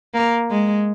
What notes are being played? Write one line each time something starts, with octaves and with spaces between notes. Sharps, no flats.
A#3
G#3